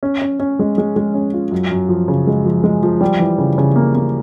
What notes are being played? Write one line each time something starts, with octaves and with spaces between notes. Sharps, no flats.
C#4
C#4
C#4
G#3
G#3
G#3
C#4
F4
F#2
F#2
F3
C#3
G#3
F3
G#3
F3
G3
E3
C#3
C#3
A#3
A#3